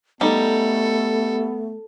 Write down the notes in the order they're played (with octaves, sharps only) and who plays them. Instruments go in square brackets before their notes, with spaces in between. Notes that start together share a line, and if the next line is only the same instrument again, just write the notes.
[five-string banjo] G3 D#4 [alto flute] A3 [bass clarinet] B3 [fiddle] A4